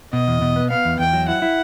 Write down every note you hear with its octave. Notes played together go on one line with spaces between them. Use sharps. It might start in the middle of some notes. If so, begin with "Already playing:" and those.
B2 D#5
E2
B2
B3
B3 F5
E2
E2 G5
F#3
E4 F#5
E4